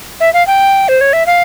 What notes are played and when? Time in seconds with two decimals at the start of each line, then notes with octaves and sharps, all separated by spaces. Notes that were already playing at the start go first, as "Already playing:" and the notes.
0.20 E5
0.34 F5
0.47 G5
0.88 C5
1.01 C#5
1.13 E5
1.26 F5